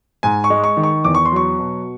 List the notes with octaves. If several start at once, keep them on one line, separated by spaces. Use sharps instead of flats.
G#2 G#5
C#6
G#3
C#6
D#3
C#6
E2 D6
C#6
C6
F#3 C#6
B2